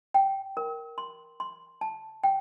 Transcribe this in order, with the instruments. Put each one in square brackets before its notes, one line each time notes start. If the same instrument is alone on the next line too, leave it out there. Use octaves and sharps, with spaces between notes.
[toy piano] G5
A#4
C6
C6
A5
G5